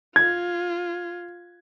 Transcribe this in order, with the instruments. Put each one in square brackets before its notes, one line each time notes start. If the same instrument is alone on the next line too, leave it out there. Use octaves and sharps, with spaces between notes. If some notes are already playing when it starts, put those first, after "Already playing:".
[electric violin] F4 [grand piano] G#6